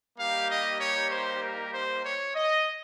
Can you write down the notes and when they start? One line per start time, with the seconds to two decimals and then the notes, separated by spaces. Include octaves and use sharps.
0.18 G3 A#3 D#4 G4 F5
0.49 D#5
0.80 C#5
1.11 C5
1.42 A#4
1.72 C5
2.04 C#5
2.35 D#5